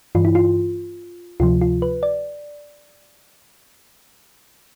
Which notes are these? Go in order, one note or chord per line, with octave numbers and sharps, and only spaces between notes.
G2 E3 F4
E4
F4
D2 C3 F3 F4
F4
B4
D5